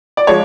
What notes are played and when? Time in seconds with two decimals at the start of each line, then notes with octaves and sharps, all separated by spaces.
0.17 D5
0.27 F3 G#3 C#5